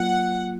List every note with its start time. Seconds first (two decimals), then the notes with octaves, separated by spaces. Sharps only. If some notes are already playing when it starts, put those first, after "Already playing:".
Already playing: F#3 A#3 F4 F#5